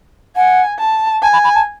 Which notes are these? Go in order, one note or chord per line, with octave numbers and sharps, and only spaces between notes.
F#5 G#5
A5
G#5 A5
B5
B5
A5